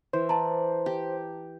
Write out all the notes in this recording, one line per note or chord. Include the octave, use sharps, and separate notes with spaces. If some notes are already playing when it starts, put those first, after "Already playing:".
E3 C5
D5 A5 A#5
G4